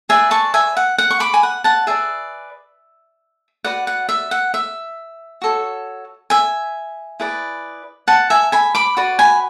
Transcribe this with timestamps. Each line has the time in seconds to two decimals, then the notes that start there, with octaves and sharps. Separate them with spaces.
0.09 G#4 B4 D5 E5 G#5
0.31 A5 C#6
0.54 E5 G#5
0.77 F#5
0.98 F#5
1.11 C#6
1.20 B5 D6
1.34 G#5
1.43 F#5
1.64 F#5 A5
1.87 G#4 B4 D5 E5 G#5
3.64 F#4 B4 D5 F#5
3.87 F#5
4.09 E5
4.31 F#5
4.54 E5
5.42 F#4 A4 C#5
6.30 E5 G#5
7.20 E4 G#4 B4 D5
8.08 F#5 A5
8.30 E5 G#5
8.52 G#5 B5
8.75 B5 D6
8.97 F#4 B4 D5
9.19 G#5 B5